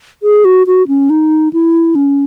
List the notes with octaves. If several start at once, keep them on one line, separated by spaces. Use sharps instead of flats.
G#4
F#4
F#4
C#4
D#4
E4
C#4